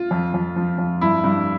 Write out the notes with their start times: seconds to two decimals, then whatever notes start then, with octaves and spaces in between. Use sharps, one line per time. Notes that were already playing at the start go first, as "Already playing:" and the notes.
Already playing: F4
0.11 F2
0.34 F2
0.56 F3
0.78 F2
1.01 G2 E4
1.24 G2